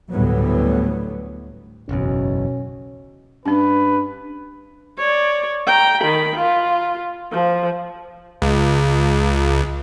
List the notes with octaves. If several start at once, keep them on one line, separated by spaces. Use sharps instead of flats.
D2 A2 F#3 G3 B3
F#1 B1 E2 B2 C#4
G2 C#4 D4 B4
C#5 D5
G5 A#5
D#3 B5
F4
F3
C#2